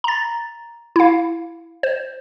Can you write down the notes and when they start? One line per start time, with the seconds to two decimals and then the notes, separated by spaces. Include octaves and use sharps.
0.04 A#5 A6
0.96 E4 F5
1.83 C5